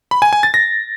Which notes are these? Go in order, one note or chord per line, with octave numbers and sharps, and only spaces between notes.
B5
G#5
G#5
A6
A#6